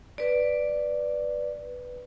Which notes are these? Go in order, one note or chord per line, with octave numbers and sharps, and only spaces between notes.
B4 D5